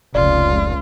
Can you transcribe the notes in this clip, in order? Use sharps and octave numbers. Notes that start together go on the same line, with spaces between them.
F1 C#2 F4 D5